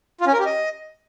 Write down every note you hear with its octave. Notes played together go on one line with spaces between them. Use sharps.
F4
C#4
A#4
G4
D#5